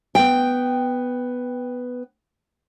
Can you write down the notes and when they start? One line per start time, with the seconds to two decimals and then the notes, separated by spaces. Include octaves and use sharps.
0.15 B3 G5